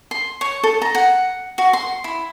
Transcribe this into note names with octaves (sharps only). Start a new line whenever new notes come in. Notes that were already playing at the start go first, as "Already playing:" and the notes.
C6
C#5
A4
A#5
F#5
F#4
C6
E4